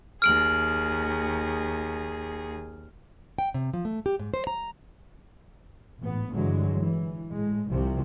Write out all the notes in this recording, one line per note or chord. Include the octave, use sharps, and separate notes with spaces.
D#2 G#4 F6 D7 F#7
G5
C3
F3
A3
G4
G#2
C5
A#5
A1 G#2 B3
G2 D3 E3 F#3 G#3
E3
A2 G#3
C2 C3 F3